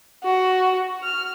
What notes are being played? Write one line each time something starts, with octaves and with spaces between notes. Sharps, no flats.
F#4
F6